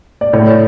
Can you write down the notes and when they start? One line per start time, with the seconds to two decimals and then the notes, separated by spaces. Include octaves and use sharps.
0.21 D5
0.33 A2 C#5